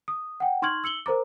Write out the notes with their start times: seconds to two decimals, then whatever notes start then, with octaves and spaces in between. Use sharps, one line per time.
0.08 D#6
0.40 F#5 G5
0.62 D#4 C6 C#6 F6 G#6 F#7
0.84 E6 C#7 F#7 G7
1.06 A#4 C5 A#5 D6